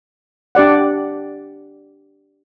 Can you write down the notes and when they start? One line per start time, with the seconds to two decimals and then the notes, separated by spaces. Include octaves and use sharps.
0.55 D4 G4 D5 F#5